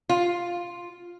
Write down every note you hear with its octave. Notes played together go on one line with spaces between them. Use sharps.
F4